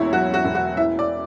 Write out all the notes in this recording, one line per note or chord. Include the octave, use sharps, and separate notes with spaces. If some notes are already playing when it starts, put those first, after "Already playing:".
Already playing: E1 E2 E4 C#5
F#3 F#4
F#4
E1
F#4
E3 E5
D5